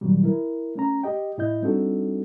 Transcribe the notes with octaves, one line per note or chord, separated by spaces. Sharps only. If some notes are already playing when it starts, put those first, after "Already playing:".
A#2 D#3 F#3 G3
E4 A#4
A3 C#4 A#5
G4 D#5 G5
A2 E4 D#5 G6
G3 C4 D4 D#4 F#4 A4